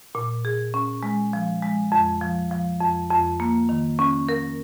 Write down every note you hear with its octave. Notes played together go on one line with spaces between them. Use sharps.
A#2
G#4
C#4
G#3
F3
G#3
F2
F3
F3
F2
F2
A#3
D#3
C#4
A#4